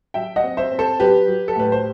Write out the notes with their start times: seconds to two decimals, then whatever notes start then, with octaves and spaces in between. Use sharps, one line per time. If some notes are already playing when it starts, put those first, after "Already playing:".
0.14 F#3 E5 G5
0.36 D#5 F#5
0.44 C4
0.57 C5 E5
0.71 C4
0.79 A4 C5
1.00 F#3 G4 B4
1.28 F#3
1.48 A4
1.56 A2 B4
1.72 C5